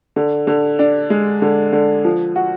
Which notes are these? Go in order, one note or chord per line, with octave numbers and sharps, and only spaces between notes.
D3
D3
D4
G#3
D3
D3
F3
F#4